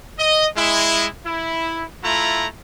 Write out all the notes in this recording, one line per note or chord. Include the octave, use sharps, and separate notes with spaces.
D#5
G#3 E4
E4
A3 E4 F4 A#5